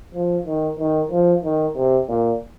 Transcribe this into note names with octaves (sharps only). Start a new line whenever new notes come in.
F3
D#3
D#3
F3
D#3
C3
A#2